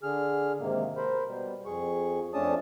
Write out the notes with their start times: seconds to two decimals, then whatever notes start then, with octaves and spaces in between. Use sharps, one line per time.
0.03 D3 G#4 F6
0.60 G#2 C3 D#3 A#3
0.97 A#4 C5 B5
1.27 B2 G3
1.66 F2 G#4 C#6
2.34 F2 A3 C#4 D4 A5 D#6